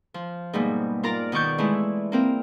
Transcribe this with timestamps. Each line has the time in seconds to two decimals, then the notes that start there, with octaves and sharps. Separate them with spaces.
0.14 F3
0.53 G#2 B2 G3 A#3
1.03 F4 A#4 D5 A#5
1.32 B2 D#3 D5 C#6 G6
1.58 E3 G#3 A3 E4
2.12 A#3 C4 A#4